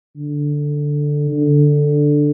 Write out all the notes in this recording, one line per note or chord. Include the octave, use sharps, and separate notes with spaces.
D3
D3